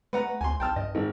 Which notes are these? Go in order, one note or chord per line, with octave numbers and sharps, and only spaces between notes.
A3 B4 F#5 A#5
D2 G#5 C6
B1 G5 A5 F6
G2 D#5
G#1